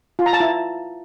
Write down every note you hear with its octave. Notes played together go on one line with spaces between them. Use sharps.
F4
A#5
A5
E4